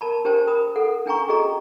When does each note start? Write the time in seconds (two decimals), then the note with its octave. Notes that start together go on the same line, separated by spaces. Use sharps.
0.01 A#4 A5 B5
0.25 D4 G4 A#4 C5 G5 A5
0.47 A#4 B5 D#6
0.76 A4 F#5
1.06 C#4 D4 G5 G#5 A#5 C#6
1.28 F#4 G#4 A4 D#5 G5 A#5